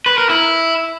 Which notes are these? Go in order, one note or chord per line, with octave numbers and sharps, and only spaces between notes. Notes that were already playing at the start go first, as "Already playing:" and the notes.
B4
A#4
E4